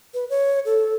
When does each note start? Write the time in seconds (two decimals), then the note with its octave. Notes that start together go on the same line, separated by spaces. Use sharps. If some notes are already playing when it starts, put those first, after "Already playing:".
0.14 B4
0.30 C#5
0.65 A4